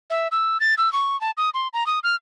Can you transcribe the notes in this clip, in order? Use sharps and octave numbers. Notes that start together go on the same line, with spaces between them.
E5
E6
A6
E6
C#6
A5
D#6
C6
A#5
D#6
F6